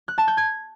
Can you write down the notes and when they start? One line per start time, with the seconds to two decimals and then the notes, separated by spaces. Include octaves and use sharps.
0.08 F#6
0.18 A5
0.28 G6
0.37 G#6